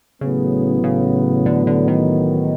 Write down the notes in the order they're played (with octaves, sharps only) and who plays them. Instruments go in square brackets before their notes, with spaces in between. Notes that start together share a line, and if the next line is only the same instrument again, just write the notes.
[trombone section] A1 A2 F#3 B3 [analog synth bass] C#3
[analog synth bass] C#3
D3
D3
D#3